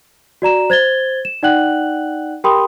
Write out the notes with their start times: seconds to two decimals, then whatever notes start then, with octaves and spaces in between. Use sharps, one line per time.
0.42 F#4 D5 A#5 E7
0.70 C5 G#6 A6 G7
1.25 E7
1.43 D#4 D5 F#5 G5 F#6 F#7
2.44 G4 A#4 G5 B5 C6 D#6